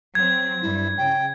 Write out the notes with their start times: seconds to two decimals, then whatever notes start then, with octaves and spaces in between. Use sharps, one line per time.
0.15 F#3 C4 G#6
0.62 G2 E4
0.97 C#3 G5